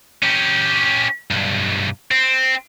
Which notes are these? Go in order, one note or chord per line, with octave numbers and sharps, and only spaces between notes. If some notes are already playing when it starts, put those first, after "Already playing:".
C#4 G4
B1 G2
C4